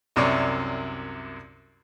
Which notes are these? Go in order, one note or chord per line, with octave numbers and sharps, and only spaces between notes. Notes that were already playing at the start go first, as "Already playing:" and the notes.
C2 F#2 C3 C#5 D5